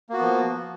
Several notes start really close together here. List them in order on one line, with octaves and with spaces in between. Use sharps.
A#3 F#4 B3 F3